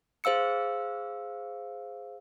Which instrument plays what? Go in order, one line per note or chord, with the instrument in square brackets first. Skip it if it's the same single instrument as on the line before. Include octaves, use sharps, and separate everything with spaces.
[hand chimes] G#4 C5 F5 E6 C#7